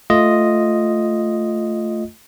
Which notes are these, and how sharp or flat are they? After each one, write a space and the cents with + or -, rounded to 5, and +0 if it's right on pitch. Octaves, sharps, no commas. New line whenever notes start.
A3 +0 F4 +0 D#5 +0